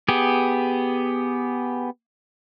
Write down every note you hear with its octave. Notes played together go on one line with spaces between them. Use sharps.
B3 G4 G#4